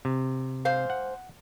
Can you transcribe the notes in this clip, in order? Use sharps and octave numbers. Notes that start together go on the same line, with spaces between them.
C3
G#2 C5 F5
F#5